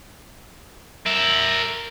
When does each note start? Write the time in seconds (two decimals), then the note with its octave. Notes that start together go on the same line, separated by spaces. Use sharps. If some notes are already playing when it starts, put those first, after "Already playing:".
1.06 A#4 E5